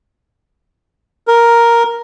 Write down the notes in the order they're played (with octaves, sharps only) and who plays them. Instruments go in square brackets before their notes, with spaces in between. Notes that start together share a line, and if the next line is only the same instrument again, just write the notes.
[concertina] A#4